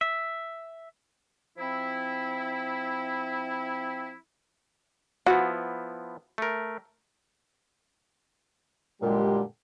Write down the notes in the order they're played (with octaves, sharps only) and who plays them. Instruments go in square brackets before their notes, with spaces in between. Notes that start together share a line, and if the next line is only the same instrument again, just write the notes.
[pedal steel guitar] E5
[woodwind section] F3 C4 E4
[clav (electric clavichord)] F3 B3 E4 [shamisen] F#4
[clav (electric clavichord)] A3 A#4
[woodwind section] F#2 A#2 G#3 [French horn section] D3 G3 G4